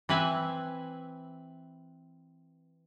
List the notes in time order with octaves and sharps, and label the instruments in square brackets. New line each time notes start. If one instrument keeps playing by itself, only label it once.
[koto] E3 C4 B4 E5 G#5